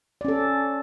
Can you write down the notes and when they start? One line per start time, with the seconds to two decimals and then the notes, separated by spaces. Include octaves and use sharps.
0.21 D5
0.25 C#4
0.28 A4